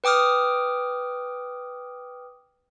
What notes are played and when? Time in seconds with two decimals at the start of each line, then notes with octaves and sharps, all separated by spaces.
0.04 B4 G5 D6 D#6 F6